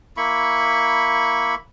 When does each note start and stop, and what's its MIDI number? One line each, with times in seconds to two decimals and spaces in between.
0.17 1.55 58
0.17 1.55 64
0.17 1.55 83
0.17 1.55 85